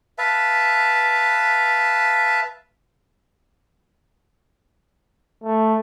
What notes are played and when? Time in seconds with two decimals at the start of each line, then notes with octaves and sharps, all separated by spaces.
0.18 B4 E5 F5 A5
5.44 A3